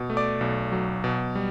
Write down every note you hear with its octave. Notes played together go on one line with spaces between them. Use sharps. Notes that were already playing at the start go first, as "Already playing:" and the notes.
Already playing: B2
A3
D5 D6
B1
F#3
B2
G3